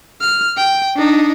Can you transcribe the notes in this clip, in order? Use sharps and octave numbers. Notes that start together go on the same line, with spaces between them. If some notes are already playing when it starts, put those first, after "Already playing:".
F6
G5
D4 D#4